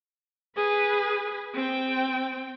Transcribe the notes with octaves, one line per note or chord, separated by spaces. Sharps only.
G#4 B4
C4 G5